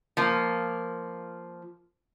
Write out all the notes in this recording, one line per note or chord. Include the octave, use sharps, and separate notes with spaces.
F3 A#3